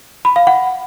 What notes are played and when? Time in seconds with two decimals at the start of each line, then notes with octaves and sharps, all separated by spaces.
0.25 B5
0.36 F5
0.47 F#5